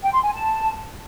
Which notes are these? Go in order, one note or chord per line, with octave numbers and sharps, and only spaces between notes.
G5
C6
G#5
A5